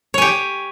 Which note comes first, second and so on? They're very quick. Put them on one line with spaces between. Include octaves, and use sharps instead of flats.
C#5 G#5 G4